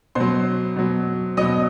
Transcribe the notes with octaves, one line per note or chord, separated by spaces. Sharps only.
B2 F#3 C5 C6
B2 F#3
B2 F#3 D#5 D#6